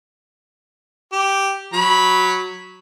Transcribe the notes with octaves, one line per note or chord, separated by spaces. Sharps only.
G4
F#3 B5